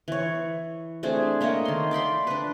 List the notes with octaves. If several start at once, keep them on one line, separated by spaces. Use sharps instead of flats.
E3 C#5
A3 C4 D4 G#4
A3 A#3 C#5 D#5
D#3 C6
D5 G5 B5 C6
D4 B4